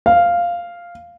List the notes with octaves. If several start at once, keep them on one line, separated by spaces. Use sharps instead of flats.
F5